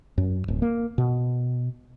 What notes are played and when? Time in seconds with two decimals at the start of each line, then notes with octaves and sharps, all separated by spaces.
0.18 F#2
0.48 D1
0.62 A#3
0.98 B2